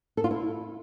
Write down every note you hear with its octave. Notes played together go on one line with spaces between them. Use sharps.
A4
F4
E4